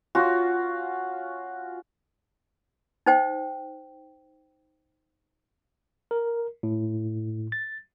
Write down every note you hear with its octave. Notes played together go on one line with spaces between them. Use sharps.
C#4 F4 F#4
D#4 C5 G5
A#4
A2
A6